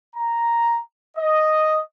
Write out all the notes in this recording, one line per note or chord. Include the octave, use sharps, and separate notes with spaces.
A#5
D#5